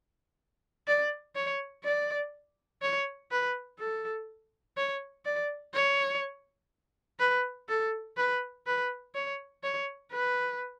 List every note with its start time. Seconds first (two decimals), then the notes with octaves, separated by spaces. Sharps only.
0.87 D5
1.36 C#5
1.84 D5
2.82 C#5
3.31 B4
3.79 A4
4.77 C#5
5.25 D5
5.74 C#5
7.20 B4
7.69 A4
8.17 B4
8.66 B4
9.15 C#5
9.63 C#5
10.12 B4